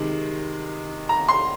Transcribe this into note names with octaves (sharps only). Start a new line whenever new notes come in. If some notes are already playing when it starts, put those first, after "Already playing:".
Already playing: C3 D#3 G#3
A#5
C6